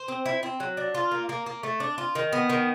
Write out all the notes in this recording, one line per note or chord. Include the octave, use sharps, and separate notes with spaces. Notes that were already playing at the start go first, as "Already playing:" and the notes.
Already playing: C5
C4
E4
C4
F#3
D4
F4
A#3
A#3
A#3
A3
D4
F4
D#3
B3
D#3